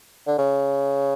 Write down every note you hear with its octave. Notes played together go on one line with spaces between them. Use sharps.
D3
C#3